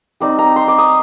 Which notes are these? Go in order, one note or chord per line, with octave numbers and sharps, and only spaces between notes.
G3 C4 D#4 D5
A#5
C6
D6
D#6